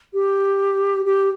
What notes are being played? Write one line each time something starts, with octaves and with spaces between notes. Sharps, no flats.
G4
G4